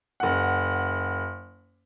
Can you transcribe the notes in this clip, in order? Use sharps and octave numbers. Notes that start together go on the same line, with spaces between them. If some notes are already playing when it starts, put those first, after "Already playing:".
F#1 F#5